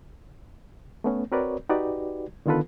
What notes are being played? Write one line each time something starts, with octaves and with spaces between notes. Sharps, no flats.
A3 B3 C#4
C4 F#4 A#4 B4 C#5 D5
D#4 F#4 G4 B4 D5
D3 D#3 B3 F4 A4 B4